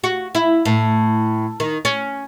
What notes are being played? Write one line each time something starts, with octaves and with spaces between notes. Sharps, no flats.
F#4
E4
A2
D#3
C#4